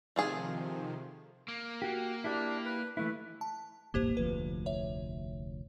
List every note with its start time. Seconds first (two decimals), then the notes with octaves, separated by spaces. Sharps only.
0.16 C3 D#3 F3 A3 F4 G#4
1.48 A#3
1.82 F#4 G4
2.24 D4 E4 G4
2.65 B4
2.97 E3 A3 E4 B4
3.41 A5
3.94 E1 A1 G2 A#3 G4 C5
4.17 F1 D2 F3 B4
4.66 C#5 E5